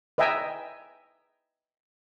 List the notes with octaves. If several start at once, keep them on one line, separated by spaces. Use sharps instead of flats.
B4 D#5 E5 G5 G#5 A#5